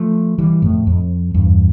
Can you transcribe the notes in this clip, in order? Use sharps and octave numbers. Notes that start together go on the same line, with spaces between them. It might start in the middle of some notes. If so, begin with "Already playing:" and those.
Already playing: F3 A3
E3 G3
F2 A2
F2
E2 G2